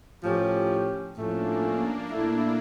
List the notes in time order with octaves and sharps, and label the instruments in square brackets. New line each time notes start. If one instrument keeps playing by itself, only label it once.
[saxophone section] A2 F3 C#4 G4
[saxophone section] A2 F3 A3 C#4 [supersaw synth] A#3 D4
[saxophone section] A#2 A3 E4 [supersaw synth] A#3 D4